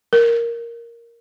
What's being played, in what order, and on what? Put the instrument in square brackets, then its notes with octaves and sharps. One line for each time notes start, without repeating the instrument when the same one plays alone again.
[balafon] A#4